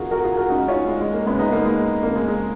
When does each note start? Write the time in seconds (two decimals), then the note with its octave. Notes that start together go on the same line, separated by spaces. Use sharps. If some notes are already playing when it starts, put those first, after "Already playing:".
Already playing: F2 D#3 F4 F#4 G#4 A#4
0.11 F#4 A#4
0.24 F4 G#4
0.37 F#4 A#4
0.49 C#2 C#3 D#4 F#4
0.68 C#4 F4
0.88 G#3
1.01 G#3
1.13 A#3
1.26 F#2 C#3 G#3 B3
1.39 B3 D#4
1.52 A#3
1.65 G#3
2.03 F2 C#3 A#3
2.16 G#3
2.28 G#3